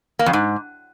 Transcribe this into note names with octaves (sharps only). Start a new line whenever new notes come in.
A#3
F2
G#2